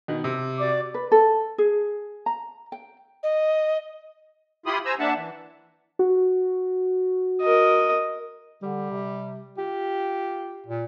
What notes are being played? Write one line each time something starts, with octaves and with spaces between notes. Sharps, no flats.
B2 D#3
C3
F#4 D5 D6
B4
A4
G#4
A#5
G5
D#5
E4 F4 G4 B5 C6 D#6
C5 G#5 A#5 E6
A#3 D4 E5 F#5 A5
E3
F#4
A#4 D#5
D3 G3
C3
F4 G4
A#2